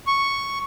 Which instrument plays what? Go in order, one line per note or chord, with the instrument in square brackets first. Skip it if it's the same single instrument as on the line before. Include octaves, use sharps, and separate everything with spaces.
[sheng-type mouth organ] C#6